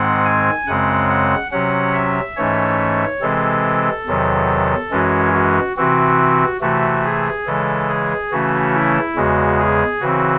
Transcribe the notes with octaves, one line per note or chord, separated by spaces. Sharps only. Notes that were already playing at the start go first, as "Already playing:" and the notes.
Already playing: G#2 D#3 G#3 C4 F#5
G#5
F#2 C#3 G#3 C4 F#5
F#5
C3 F#3 C#4 F#5
E5
G#2 E3 A3 C#4 C#5
C3 E3 G#3 C4 A4
E2 C3 D#3 F#3
F#2 E3 G#3 C#4 F#4
F#4
C3 E3 C4 F#4
C3 E3 A3 F#4
G#4
C#3 E3 G#3 A4
G#4
C#3 E3 A3 C#4 F#4
E4
E2 C#3 G#3 F#4
G#4
C#3 E3 C4 F#4